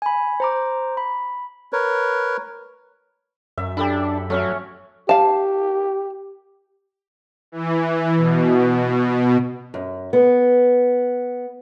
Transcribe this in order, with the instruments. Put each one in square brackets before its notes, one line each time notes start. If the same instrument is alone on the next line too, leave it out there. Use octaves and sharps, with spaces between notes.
[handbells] G#5 B5
C5 A#5 D6
B5
[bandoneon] A#4 B4 C#5
[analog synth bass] F#2 [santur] E5
[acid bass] D4 [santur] G4 A4 B5
[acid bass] F#3 [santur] A3 C#4 C#6
[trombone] G4 [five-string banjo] F5 A5
[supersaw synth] E3
B2
[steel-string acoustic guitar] F#2
B3